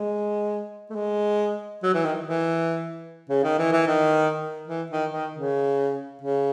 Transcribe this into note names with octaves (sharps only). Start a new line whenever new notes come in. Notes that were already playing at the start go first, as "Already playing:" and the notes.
Already playing: G#3
A3
G#3
F#3
E3
D#3
E3
C#3
D#3
E3
E3
D#3
E3
D#3
D#3
C#3
C#3